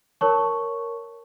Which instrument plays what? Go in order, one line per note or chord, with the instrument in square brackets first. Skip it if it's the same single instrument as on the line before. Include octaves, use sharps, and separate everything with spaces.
[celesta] A#4 C#5 C#6 [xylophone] A5